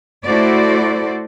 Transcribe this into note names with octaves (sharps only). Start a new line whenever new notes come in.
A3 E4 F#4 A4 C5 D5